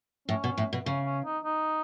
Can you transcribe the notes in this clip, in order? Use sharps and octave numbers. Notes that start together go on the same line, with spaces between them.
A2 C#4
B2
A2
B2
C#3 C#4
C#4
D#4
D#4